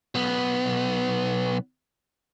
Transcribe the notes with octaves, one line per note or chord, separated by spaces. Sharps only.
B1 B3